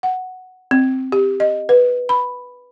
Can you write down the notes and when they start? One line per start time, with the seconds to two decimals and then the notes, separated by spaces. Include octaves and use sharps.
0.03 F#5
0.71 C4
1.12 G4
1.40 D#5
1.69 B4
2.09 B5